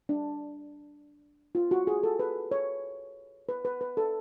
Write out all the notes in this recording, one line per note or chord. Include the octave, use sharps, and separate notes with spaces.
D4
F4
F#4
G#4
A4
B4
C#5
B4
B4
B4
A4